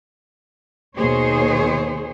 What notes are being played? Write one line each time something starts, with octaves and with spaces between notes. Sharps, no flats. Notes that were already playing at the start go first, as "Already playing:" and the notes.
D#2 B2 D#3 G#4 C5 C#5